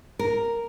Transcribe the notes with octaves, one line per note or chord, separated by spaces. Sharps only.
A#4